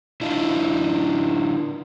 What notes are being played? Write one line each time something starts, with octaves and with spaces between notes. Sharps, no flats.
D3 D4 E4 F4